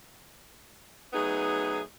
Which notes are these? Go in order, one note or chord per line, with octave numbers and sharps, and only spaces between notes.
F#3 A3 B3 D#4 G#4